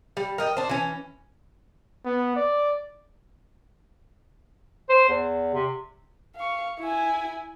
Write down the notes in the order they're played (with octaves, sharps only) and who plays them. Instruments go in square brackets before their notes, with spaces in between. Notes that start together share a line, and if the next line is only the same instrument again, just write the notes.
[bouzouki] G3
A#4 D#5 G5
D4 C5
E3 C#4
[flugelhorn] B3
D5
[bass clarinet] C5
E2
C3
[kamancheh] F5 C#6
E4 G#5